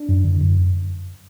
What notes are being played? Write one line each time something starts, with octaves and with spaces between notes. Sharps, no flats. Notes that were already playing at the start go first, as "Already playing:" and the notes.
Already playing: D4
F#2
D3
F#2